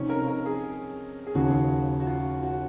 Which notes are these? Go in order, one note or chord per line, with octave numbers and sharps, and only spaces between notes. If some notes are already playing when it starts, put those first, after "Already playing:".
Already playing: C3 F3 C4 C#4 D#4
A#4
A#4
G#4
G#4
D#2 C#3 F3 F#4
F#4
F4
F#4